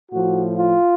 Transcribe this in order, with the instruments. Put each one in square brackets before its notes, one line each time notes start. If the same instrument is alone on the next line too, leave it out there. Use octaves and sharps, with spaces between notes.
[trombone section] A2 F3 F#4
F4